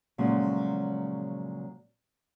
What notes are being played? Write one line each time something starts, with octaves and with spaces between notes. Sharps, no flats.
A#2 C#3 F3 F#3 G#3 A3